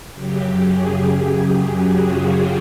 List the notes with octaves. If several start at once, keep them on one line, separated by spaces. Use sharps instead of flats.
F#2 C#3 F#3 G4
G#4
G4
F#4
F4